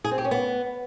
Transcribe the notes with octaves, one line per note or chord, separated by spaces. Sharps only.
G#4
C4
G4
C#4
B3